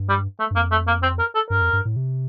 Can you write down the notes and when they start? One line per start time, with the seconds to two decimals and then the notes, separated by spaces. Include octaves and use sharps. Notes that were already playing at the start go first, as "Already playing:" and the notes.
Already playing: G2
0.09 G3
0.40 A3
0.51 G2
0.56 F2 A#3
0.72 A3
0.88 A#3
1.03 C4
1.19 A#4
1.35 A4
1.50 G2 A#4
1.61 F2
1.73 G2
1.85 A2
1.96 C3